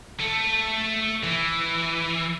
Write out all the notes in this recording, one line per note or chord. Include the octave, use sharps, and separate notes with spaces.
A3
E3